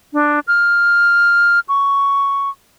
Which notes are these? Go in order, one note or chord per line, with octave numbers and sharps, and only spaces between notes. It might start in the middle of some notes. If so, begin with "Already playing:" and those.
D4
F6
C#6